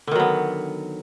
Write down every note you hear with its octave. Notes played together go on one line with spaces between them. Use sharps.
D3 D#3 F#3 B3